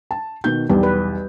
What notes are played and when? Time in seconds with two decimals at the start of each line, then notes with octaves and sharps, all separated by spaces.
0.11 A5
0.44 B2 D#3 G6
0.70 B1 E2 G3
0.83 B4